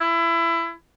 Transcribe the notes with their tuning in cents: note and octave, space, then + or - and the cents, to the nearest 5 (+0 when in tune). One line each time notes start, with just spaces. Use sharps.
E4 +25